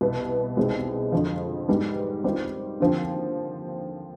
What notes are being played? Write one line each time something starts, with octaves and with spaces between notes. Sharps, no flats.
C2 B2 B3
C2 B2 G#3 C4 D#4
F2 D3 F3
G#2 G3 B3
D#3 G3 C4 F4 C5
D#2 D3 F3 C4